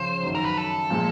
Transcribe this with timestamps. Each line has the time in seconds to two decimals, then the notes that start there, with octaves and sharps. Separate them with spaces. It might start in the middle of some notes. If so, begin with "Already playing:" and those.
Already playing: C#3 F3 C5
0.23 F#2 D#3 F#3
0.35 A#4
0.45 B4
0.57 A4
0.90 A#2 F3 G#3